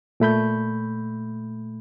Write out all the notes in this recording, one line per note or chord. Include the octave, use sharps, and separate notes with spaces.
A#2 A3 B5 G6